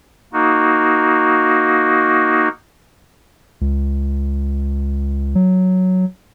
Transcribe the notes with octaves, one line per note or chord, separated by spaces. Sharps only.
A#3 D#4 F#4
C#2
F#3